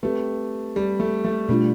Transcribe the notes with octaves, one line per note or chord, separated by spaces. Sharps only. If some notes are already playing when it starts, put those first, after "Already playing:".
A3 C4 G4 B4
G3
A3
A3
B2 G3 A3 D4 F4